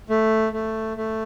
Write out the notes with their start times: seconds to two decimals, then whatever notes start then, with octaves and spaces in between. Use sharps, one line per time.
0.10 A3
0.53 A3
0.97 A3